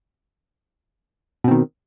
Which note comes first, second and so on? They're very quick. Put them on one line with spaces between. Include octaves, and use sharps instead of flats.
B2 C4 D#3